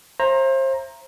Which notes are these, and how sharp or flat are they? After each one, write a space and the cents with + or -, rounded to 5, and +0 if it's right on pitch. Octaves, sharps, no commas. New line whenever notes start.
C5 +30 E5 +30 A#5 +0